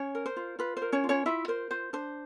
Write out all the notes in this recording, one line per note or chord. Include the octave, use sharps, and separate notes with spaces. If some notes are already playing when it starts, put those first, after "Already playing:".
Already playing: C#4 C#5
A#4
C5
F4
F4 B4
C5
A#4
C#4 C#5
F4
C#4 C#5
E4 F4 E5
A#4 C5
F4 C5
D4 C5